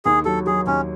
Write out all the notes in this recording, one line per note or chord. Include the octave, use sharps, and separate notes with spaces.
D#2 G#4
F#3 A4
F#3 G#4
D#2 C#4